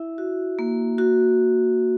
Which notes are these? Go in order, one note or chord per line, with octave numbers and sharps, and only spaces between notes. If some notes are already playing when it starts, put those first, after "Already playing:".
Already playing: E4 E5
F#4
A#3
F#4